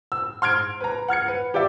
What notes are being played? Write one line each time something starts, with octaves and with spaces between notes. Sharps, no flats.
E6
C6 F6 G#6 D7
B4 A#5
F#5 F6 G#6 C#7
B4
G4 D5 E5